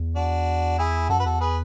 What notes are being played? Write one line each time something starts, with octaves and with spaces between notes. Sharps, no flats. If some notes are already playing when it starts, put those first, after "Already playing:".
Already playing: E2
D4 F#4
E4 G#4
F#2 F#4 A4
B4
E2 F#4 A4
G#4 B4